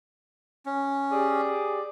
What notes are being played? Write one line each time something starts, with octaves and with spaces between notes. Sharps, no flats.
C#4
G4 G#4 D5